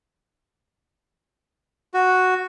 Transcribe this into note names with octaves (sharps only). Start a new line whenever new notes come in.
F#4